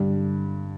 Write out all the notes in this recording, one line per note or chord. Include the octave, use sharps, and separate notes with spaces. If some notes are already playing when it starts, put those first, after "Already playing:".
Already playing: G2 D3 G3